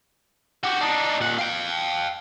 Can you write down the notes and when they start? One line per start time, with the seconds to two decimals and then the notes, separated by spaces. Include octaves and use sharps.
0.63 F#4 G4
0.81 D4 D#4
1.21 A#2 F#5
1.38 F5 G5